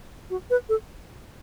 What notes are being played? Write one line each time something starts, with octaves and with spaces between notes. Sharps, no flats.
F#4
B4
A4